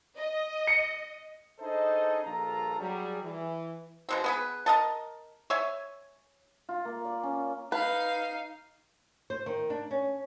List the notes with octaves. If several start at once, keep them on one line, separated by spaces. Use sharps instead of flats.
D#5
C#7
D4 D#4 G#4 A4 C5 D#5
A#1 G2 F4 A4 A#5
F#3 G3 G#4
E3
B2 G#3 C4
B3 G#4 B4
A#4 D#5 A5
C#5 E5 G#5
F4
A#3
D5
C#4
D#4 B4 F5
C5
D#3
D4
C#4